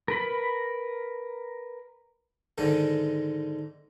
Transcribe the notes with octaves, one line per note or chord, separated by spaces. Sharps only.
A#4 B4 B5
G#2 D3 D#3